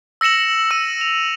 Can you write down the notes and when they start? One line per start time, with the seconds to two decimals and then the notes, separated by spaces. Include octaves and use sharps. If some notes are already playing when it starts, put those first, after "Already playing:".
0.21 E6 A#6 C#7 E7 F#7
0.71 E6 D#7
1.01 F7